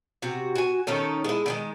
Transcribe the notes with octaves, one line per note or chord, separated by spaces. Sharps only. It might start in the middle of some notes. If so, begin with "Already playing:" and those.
C3 F#4
F#4 G#5
D#3 C#4 D#4 A4
G#3 E4
D3 D#3 G#3